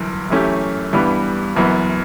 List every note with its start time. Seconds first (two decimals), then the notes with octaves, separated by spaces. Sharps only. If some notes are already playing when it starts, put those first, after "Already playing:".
Already playing: G1 F#2 E3
0.30 F#2 E3 A3 C#4 G4
0.93 G2 E3 G3 B3
1.56 F#1 F#2 E3 B3